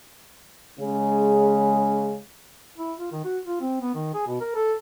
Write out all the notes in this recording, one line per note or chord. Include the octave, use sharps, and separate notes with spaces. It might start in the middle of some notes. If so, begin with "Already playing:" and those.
C#3 G#3
E4
F4
D#3
F#4
F4
C4
B3
D#3
G#4
B2
A#4
A4